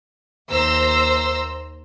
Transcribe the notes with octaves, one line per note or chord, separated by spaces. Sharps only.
D#2 C5 A#5 E6